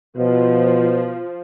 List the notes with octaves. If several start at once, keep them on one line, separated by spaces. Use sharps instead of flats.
B2 F3